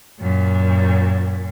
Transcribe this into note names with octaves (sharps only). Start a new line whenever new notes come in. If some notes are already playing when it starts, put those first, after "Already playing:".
F#2 A#2